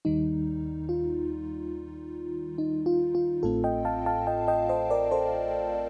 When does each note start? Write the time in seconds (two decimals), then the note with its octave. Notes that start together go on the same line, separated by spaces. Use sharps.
0.05 D#2 D#3 G3 D#4
0.89 F4
2.58 D#4
2.86 F4
3.15 F4
3.43 A1 A2 A3 C4 F4 A4
3.64 D#5 G5
3.85 F5 A5
4.06 F5 A5
4.27 D#5 G5
4.48 D#5 G5
4.69 C5 D#5
4.90 A#4 D5
5.11 A4 C5